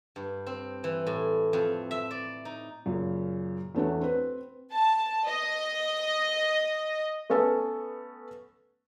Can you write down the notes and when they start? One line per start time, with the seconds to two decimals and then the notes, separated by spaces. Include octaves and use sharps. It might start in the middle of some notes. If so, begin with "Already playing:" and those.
0.16 G2
0.46 C4
0.84 E3
1.07 A2
1.53 F2
1.91 E5
2.11 D5
2.45 D#4
2.86 F#2 A#2 C#3
3.75 E2 A3 C#4 D4 F#4
4.01 C4 B4
4.73 A5
5.26 D#5
7.30 A3 B3 C#4 A4